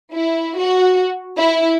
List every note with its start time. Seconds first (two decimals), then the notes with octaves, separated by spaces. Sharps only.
0.14 E4
0.60 F#4
1.37 E4